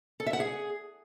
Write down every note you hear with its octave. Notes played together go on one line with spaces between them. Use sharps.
A4
E5
F#5
G#4